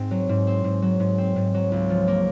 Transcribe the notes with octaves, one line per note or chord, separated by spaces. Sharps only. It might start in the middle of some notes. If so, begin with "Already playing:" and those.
Already playing: G#2 C4
F#3
G#2
C4
G#2
F#3
G#2
C4
G#2
F#3
C#2
F3
A#3